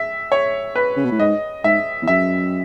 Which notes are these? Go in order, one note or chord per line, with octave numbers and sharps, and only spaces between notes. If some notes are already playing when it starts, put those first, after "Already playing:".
Already playing: E5
C#5
B4
C#3
B2
A2
G#2 D#5
G#2 E5
E2
F#2 E5